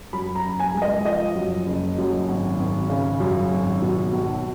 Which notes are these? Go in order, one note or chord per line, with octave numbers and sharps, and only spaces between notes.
F#2 B5
A#5
F#1
G#5
G#3
D#5
F3 D#5
F#2
F#1
F#2
G#1
G#1
C#3
F#2
G#1
B2
B1